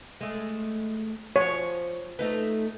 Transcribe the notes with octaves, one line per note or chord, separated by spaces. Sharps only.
G#3 A3
F3 C#5
A3 D#4 B4